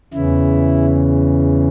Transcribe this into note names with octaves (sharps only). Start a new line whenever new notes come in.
E2 C#3 E3 E4